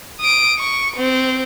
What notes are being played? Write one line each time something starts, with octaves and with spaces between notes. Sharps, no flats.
D#6 D7
C#6
C4